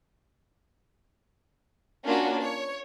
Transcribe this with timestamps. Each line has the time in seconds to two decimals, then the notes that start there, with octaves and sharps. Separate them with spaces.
2.06 A#3 C#4 D4 F4 F#4
2.41 C#5